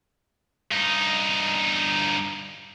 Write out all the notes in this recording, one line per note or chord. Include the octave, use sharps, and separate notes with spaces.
G2 D#4